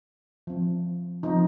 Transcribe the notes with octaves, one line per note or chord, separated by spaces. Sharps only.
F3 C4
F3 C4 D#4